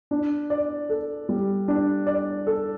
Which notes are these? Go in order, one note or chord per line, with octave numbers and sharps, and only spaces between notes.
D4
D5
A4
G3
D4
D5
A4